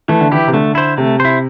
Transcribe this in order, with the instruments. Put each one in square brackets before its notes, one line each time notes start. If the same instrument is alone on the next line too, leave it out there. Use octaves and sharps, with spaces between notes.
[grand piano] E3 [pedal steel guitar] A3
[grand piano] D3
[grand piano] E3 [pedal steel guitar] E4 G4
[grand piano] C3
[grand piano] D3 [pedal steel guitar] A3
[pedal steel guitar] E4 C5
[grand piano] C3 [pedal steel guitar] A3
[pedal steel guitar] E4 C5